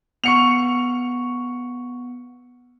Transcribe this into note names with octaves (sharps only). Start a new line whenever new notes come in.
B3 F#5 C#6 C#7 F7